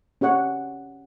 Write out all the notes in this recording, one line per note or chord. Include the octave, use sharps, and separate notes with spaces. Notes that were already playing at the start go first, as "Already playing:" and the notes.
C#4 G4 C#5 F#5